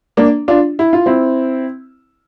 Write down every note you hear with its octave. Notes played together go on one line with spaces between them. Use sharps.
A#3 D4
D4 F4
E4
F4
C4 E4